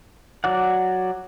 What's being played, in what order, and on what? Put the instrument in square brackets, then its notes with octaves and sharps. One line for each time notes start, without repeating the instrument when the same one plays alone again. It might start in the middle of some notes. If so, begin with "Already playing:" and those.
[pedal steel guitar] F#3 F#4 D5 F#5